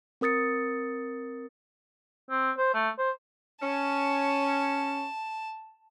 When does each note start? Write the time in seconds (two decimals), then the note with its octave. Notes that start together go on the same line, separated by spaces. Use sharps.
0.21 C4 A#4 D#6 A6 C#7
2.30 C4
2.58 C5
2.74 A3
2.98 C5
3.62 C#4 A5